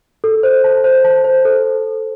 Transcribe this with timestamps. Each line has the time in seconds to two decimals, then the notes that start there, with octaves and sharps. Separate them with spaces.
0.24 A4
0.43 C5
0.64 A5
0.84 C5
1.04 A5
1.25 C5
1.45 A4